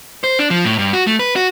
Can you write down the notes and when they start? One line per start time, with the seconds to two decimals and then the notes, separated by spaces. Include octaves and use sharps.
0.24 C5
0.39 D4
0.50 F3
0.65 A2
0.79 G2
0.93 F#4
1.07 A3
1.19 B4
1.36 F#4